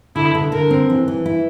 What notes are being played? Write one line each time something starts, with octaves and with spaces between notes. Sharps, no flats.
D3 E4
D3
D3 A#4
C4
E3
E3
E4